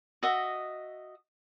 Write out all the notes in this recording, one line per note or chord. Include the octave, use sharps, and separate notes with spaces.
F#4 D#5 E5